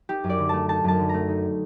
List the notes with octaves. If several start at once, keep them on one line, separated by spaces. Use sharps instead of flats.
D#4 G4
F#2
D5
D3
A3 A5
D#4 A5
F#2 A5
D3
A3 A#5
D#4